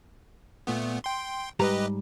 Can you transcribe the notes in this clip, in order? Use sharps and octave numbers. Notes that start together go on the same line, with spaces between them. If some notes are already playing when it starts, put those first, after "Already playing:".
A#2 A3 B3
G5 C6
G#2 G3 G4 B4 D#5 A#5